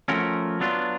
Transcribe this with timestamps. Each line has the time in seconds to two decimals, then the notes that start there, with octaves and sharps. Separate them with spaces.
0.08 F3 A3 C#4 F#4 A#4
0.60 F#3 B3 D4 F4